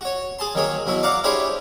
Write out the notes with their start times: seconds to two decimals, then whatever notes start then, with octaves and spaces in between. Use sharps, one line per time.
0.01 F#4 C#5
0.39 G#4 A5 C6
0.55 D#3 F#3 A#3 G#4 C#5
0.86 B2 F#3 E4 F#4
1.03 D5 F5 F#5 A#5 D6
1.24 D4 E4 G4 G#4 C5 C#5